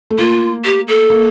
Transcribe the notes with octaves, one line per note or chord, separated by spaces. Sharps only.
A3
A#3 F4
G4
A4
A#3